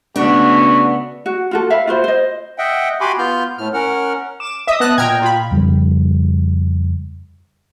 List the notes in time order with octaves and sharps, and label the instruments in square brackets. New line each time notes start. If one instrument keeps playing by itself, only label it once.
[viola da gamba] C#3 A3 B3 [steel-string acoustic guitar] D4 [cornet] F#4
[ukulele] F#4
F4 F#4 A4
E5 F5 B5
F4 F#4 C5
C5 D#5
[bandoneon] D#5 E5 F#5 G5
F#4 G4 G#5 B5 C6 D6
B3 F4 F6 G6
A2 F6
C#4 A#4 F#5 F6
[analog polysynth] D6 E7
[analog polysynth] D#5 D#6 [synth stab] E5
[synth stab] B3 A5 F#6
[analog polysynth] A#2 G5 [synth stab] A#5 F6 G#6
[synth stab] F4 B5
[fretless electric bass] F2 C#3 G3